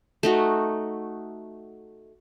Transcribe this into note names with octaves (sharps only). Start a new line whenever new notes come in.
A3 D#4 F#4